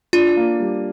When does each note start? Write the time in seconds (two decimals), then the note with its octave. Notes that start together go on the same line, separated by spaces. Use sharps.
0.13 D4 F4
0.37 A#3
0.60 G3